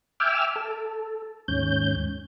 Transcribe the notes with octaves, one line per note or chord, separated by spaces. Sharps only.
E5 G5 G#5 D6 E6 F6
A4
D#2 G#2 C#4 G6